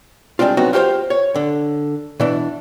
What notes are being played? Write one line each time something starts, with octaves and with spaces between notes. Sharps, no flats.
G3 G#3 C4 D4 F4
F#3 B3 C4 D#4 F#4
F4 G4 A4 C5 F5
C#5
D3
B2 E3 D4